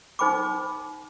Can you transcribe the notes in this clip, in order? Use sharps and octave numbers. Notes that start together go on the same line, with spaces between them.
D#4 C5 G5 B5 D6